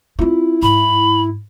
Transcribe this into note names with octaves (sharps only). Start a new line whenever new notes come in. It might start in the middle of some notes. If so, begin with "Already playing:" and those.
C4 E4 F4
G#2 B5